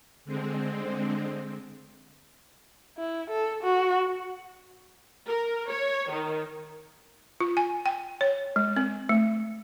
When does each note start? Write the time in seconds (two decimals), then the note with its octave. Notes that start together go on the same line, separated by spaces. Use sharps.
0.25 D3 G#3 C4
2.98 E4
3.30 A4
3.63 F#4
5.28 A#4
5.68 C#5
6.11 D#3
7.40 F4
7.57 G#5
7.86 G5
8.21 C#5
8.56 G#3
8.77 C4
9.09 A3